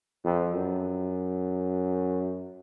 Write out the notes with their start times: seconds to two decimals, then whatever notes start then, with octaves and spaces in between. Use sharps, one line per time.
0.24 F2
0.55 F#2